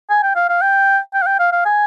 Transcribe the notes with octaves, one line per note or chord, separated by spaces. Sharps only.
G#5
G5
F5
F5
G5
G5
F5
G5
F5
F5
G#5